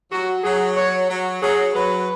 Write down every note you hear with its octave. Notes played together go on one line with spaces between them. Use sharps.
F#3 F#4
F#3 G#4
C#5
F#3
F#3 G#4
F#3 B4